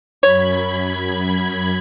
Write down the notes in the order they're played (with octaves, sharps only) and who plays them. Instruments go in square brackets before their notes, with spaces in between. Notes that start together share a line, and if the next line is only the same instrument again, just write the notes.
[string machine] F#2 B5 G#6 [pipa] C#5